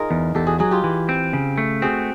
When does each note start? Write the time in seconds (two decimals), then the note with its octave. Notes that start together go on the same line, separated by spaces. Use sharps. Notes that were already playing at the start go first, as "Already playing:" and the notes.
Already playing: D#4 F4 G#4 A#4
0.11 E2
0.35 E2 G4 A4
0.47 F#4 G#4
0.59 F#3 F#4 G#4
0.71 F4 G4
0.84 E3
1.09 C4
1.33 C#3
1.58 A3
1.82 C4 F#4 G#4